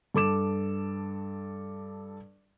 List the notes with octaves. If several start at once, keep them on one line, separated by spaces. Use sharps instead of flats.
G2 A4 D6 E7